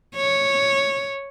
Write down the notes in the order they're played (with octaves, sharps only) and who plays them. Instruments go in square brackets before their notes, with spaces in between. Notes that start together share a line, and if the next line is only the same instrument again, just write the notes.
[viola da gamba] C#5